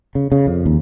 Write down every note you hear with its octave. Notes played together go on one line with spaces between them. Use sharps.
C#3
C#3
F2
D#2